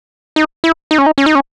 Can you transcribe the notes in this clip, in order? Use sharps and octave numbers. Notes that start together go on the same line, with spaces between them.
D#4
E4
D#4
C#4
D#4
C#4
D#4
C#4